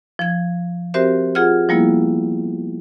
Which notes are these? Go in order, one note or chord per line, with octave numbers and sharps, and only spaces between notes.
F3 G#6
C4 F#4 G4 A#4 C5 E5
F4 G#4 F#5 F6
F3 G3 A#3 B3 E4